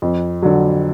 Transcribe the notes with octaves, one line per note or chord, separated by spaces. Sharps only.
F2
D3 F#3